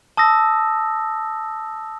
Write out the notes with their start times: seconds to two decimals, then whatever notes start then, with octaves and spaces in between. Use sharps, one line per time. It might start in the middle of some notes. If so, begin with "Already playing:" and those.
0.17 A5 D#6 E6 A#6